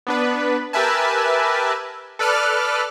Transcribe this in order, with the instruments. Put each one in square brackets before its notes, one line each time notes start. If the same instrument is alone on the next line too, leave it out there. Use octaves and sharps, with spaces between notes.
[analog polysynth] B3 D4 B4
G4 A#4 B4 E5 G#5 A5
A4 B4 D5 F6 F#6